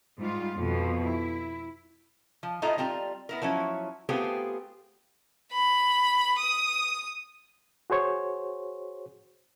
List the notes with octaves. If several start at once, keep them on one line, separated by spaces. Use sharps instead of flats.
G#2 G3 F4
F2 B2 F3
E4
F3
A2 A3 D#4 F4 D#5 A#5
G3 C4 F4 A#5
B3 E4 A#4
F3 F#3 C#4 E4
A3 B3 C4 F4 G4 G#4
B5
D#6
F#4 G#4 C5 C#5